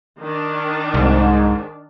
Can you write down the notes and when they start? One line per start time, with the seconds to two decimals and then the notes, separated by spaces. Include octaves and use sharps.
0.20 D#3 D4
0.94 C2 G#2